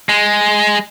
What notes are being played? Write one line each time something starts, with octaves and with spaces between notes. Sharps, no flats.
G#3